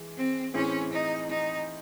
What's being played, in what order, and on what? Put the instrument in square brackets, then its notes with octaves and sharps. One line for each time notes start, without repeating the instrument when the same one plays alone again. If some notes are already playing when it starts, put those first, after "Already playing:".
Already playing: [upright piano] E3 G#3
[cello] C4
[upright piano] A2 E3 C4 E4 G#4 [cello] C#4
[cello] D#4
D#4